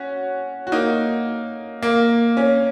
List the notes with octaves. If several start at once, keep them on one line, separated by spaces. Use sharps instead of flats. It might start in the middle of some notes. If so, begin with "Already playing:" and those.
Already playing: C#4 F#4
F#4
A#3 D#4
A#3
C#4